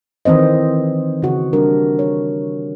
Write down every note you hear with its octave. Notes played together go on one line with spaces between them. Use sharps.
D#3 E3 C4 C5 D#5
C#3 F#4
G3 D4 A#4
C#5